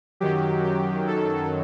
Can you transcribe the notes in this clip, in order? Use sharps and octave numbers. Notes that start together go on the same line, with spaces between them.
F#2 D#3 F#3 G4
G4
A4